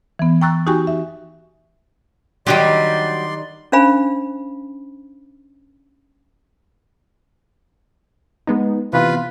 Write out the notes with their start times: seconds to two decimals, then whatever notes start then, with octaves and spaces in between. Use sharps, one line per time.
0.19 E3 B3
0.41 G5 A#5 C#6 E6 F#6 A6
0.67 D#4 F#4 G4 G5 G#5 C#6
0.87 E5
2.47 D#3 F#3 G3 D#4 G4 D5 C6
3.72 C#4 D4 C5 F5 G#5 B5
8.47 G#3 B3 D#4
8.93 C3 E3 B3 F4 B4